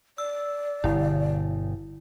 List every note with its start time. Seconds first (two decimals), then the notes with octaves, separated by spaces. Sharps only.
0.18 D5 E6
0.84 G1 B2 D3 E4